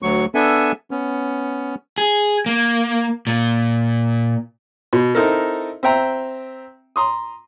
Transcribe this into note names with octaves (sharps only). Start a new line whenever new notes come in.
D2 F#3 C#6
B3 D4 A4 E5 G#5
B3 C#4
G#4
A#3
A#2
B2
C4 D#4 E4 A4 A#4
C4 E5 G5 A#5
A#5 C6 D#6